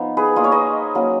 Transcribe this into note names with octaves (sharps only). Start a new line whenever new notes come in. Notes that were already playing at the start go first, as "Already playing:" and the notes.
Already playing: F3 B3 D#4
G#4 B4
A#3 F4 D#5
C#5
B4 D#5
F#3 A#3 C#4